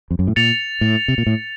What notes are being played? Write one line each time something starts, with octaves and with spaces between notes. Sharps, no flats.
F2
F#2
A2
A#2 A6 C#7 F7
A2
C3
A#2
A2